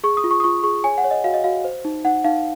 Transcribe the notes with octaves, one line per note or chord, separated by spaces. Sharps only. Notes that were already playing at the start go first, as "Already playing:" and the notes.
G#4 C#6
D#6
F4
C#6
D#6
F4 C#6
G#4 C#6
C#5 G#5
F#5
C#5
D#5
F#4 F5
D#5
F#4 F5
C5
D#4
D#4 F#5
D#4 F5